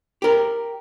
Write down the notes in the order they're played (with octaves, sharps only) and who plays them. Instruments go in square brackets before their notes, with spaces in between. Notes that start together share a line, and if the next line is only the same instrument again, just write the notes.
[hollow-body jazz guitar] G4 A#4